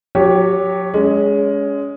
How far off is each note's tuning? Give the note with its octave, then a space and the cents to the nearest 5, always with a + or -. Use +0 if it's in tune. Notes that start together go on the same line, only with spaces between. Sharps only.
F#3 -30 G4 +0 C#5 +15
G#3 +0 C#4 +30